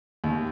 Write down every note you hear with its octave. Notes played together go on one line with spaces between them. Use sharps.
D#2